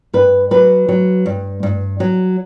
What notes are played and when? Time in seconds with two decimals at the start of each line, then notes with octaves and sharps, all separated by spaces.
0.14 G2 B4
0.51 F#3 B4
0.89 F#3
1.26 G2
1.63 G2
2.00 F#3